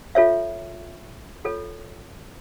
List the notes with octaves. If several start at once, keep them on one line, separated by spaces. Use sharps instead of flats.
F4 A4 C#5 E5
F4 A4 C#5